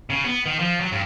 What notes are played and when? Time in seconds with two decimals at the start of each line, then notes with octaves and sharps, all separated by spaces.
0.10 C#3
0.24 B3
0.46 D#3
0.59 F3
0.81 F#3
0.92 G2